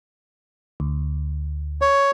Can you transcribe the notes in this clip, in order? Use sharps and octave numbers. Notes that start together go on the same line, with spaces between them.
D2
C#5